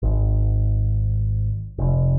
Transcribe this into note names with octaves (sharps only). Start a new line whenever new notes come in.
G#1
F1